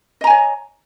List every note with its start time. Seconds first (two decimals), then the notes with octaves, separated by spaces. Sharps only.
0.21 D#5
0.24 A#5
0.27 G#5
0.30 C#5